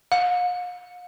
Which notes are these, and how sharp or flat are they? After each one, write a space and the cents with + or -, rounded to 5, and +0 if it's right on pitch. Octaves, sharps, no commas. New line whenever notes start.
F5 +45